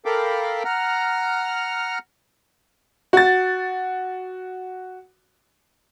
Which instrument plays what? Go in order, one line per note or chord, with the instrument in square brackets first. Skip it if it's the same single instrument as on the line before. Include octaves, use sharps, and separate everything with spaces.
[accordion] A4 A#4 F5 G5 B5 D6
F#5 A#5 F6
[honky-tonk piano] F#4 A6